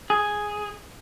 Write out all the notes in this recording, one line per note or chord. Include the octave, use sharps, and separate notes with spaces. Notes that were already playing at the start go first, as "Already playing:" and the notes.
G#4